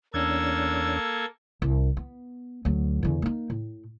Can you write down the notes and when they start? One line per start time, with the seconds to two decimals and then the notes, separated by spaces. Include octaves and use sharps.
0.14 E2 A#3 C#4 D4 A4 E6 G#6
1.62 C2
1.97 B3
2.65 D2 F#3
3.03 E2 D3
3.22 A#3 D#4
3.50 A2